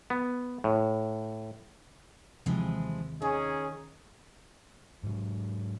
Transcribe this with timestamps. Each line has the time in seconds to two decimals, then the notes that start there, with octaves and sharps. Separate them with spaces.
0.10 B3
0.64 A2
2.46 D#2 C3 E3 F3 G#3
3.22 D#3 C#4 D#4 G#4
5.03 G#2 F#3